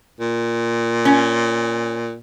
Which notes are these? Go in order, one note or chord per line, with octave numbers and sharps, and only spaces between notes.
A#2
C#4